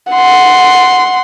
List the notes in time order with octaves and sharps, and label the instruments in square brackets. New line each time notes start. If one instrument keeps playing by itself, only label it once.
[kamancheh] F#5 C6